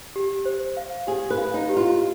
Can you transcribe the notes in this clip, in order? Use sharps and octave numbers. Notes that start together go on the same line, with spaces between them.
G4
C5
F5
G4 G#4
B4
F5
D#4
G4
F4